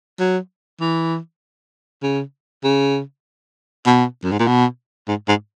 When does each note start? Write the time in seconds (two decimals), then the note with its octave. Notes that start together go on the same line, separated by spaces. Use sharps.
0.20 F#3
0.81 E3
2.03 C#3
2.64 C#3
3.86 B2
4.23 F#2
4.32 G#2
4.40 A#2
4.47 B2
5.08 G#2
5.28 G#2